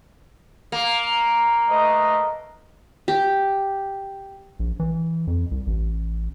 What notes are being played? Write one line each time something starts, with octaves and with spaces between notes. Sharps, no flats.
A#3
A3 B4 D#5
G4
A#1
E3
F2
C2
A1